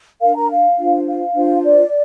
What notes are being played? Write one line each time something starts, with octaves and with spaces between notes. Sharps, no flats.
D4 A#4 F5
A#4 A#5
F5
D4 F4 C5
F5
D4 F4 C5
D5